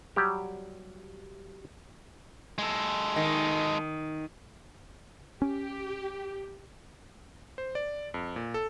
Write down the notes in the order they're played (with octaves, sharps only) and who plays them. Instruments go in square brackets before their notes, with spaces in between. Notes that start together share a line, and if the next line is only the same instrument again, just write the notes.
[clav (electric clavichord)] F#3 G3 G4
[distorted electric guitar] G#3 A4
[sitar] D#3
[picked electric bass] C#4 [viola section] G4
[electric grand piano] C5
D5
F2
A#2
A4